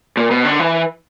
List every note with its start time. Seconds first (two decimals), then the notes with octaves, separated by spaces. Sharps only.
0.17 A#2
0.31 B2
0.45 D3
0.60 E3